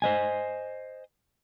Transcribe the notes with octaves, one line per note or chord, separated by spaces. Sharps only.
C5 D#5 G#5